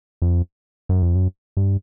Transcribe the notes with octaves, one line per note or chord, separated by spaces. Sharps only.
F2
F#2
F2
F#2
G2